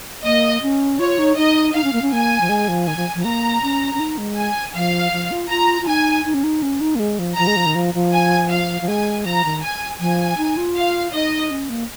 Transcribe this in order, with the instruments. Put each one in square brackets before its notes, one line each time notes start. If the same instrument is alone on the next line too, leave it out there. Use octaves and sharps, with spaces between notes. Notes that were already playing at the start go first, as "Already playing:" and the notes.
[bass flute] A#3 [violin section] D#5
[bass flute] C#4
[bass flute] F4 [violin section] C#5
[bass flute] D#4
[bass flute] D#4 [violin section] D#5
[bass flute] D#4 [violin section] F5
[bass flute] C#4
A#3
C#4
[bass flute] A#3 [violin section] G#5
[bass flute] F3
G#3
F3
[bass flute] D#3 [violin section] G#5
[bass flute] F3
F3
[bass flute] A#3 [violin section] A#5
[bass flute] C#4
C#4
D#4
G#3
[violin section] G#5
[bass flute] F3 [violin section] F5
[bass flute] F3
F4
[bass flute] F4 [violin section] A#5
[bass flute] F4
[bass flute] D#4 [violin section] G#5
[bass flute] D#4
C#4
D#4
C#4
D#4
A#3
G#3
F3
[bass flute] F3 [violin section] A#5
[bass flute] G#3
F3
D#3
F3
F3
[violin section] G#5
F5
[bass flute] F3
[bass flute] G#3 [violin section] G#5
[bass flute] F3 [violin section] A#5
[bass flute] D#3
[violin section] G#5
[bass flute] F3 [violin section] G#5
[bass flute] D#4
F4
[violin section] F5
[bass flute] D#4 [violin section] D#5
[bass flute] C#4
A#3